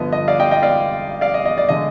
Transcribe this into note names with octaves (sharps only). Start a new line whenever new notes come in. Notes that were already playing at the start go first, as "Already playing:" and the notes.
Already playing: G2 D3 F3 B3 D#5
D#5
D5 F5
D#5 G5
D#5 G5
D5 F5
D5 F5
D#5
D#5
D5
D3 G#3 D#5